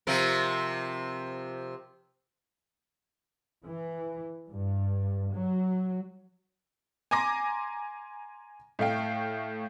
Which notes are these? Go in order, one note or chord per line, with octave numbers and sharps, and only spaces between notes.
C3 F3 A#4
E3
G2
F#3
G#5 A#5 C6 D6 A#6
A2 A3 F5 G5